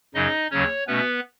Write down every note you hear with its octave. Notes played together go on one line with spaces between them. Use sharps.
F#2 C#3 F#3 D#4 D#5
D#2 C#3 F#3 C#4 C#5
B2 A3 B3 C#4 B4